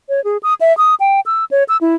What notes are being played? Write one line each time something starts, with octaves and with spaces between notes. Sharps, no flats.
C#5
G#4
D#6
E5
D#6
G5
E6
C#5
E6
E4